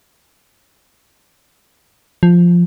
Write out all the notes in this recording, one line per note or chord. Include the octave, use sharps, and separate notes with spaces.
F3